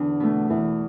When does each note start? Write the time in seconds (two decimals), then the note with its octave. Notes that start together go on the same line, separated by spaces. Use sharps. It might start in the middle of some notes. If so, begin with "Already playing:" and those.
Already playing: E2 D3
0.20 B2 A3
0.50 E2 E3